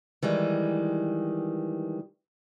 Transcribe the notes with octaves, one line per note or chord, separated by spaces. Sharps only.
D#3 E3 G3 G#3